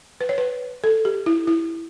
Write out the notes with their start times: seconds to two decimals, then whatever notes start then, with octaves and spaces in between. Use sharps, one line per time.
0.21 B4
0.29 C#5
0.38 B4
0.84 A4
1.05 G4
1.26 E4
1.47 E4